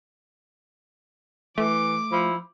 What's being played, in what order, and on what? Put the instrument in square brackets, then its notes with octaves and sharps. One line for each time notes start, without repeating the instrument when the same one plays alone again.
[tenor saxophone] E3 [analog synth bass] A3 [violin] D6
[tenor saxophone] F3 [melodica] E4